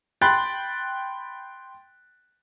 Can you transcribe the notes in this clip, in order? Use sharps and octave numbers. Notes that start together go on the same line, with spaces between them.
G5 B5 C6 F#6 A6